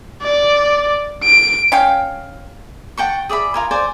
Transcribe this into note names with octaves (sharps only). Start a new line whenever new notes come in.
D5
D7
C#4 F5 G5
F#5 G5 A5 C#6
G#4 D5 E5 B5
F4 A#4 G#5
C5 D5 G#5